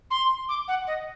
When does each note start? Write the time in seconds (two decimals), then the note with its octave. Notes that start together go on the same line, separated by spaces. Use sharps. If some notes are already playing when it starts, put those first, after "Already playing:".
0.11 C6
0.49 D6
0.68 F#5
0.87 D#5